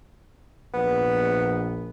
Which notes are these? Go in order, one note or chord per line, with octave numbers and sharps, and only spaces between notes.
A#1 B3